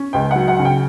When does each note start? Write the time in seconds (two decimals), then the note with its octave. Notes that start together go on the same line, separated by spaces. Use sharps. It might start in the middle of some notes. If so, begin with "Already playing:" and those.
Already playing: C#4
0.13 C#2 G5
0.31 F#3 F#5
0.48 F#5
0.59 C#3
0.65 G5